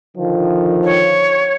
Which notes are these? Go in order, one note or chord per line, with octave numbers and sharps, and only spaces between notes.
D3 D#3 F3
C#5